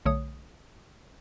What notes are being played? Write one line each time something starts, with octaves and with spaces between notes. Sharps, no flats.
B1 D3 A3 C#5 D#6